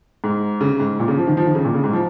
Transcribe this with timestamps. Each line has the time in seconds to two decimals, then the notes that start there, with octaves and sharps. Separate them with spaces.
0.24 G#2
0.61 C#3
0.80 G#2
0.99 A#2
1.08 C#3
1.17 F3
1.27 D#3
1.37 F3
1.46 D#3
1.55 C#3
1.65 A#2
1.74 C#3
1.84 G#2
1.93 F3